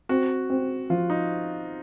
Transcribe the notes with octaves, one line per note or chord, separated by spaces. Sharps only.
C4 F#4
C4
F3 F4
D#4